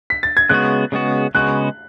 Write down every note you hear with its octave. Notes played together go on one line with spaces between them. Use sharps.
B6
A6
G#6
C#3 G#3 B3 F#4 F#6
C#3 G#3 B3 F#4
C#3 G#3 B3 F#4 F#6